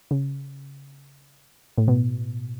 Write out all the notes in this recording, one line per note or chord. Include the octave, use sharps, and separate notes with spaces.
C#3
A2
B2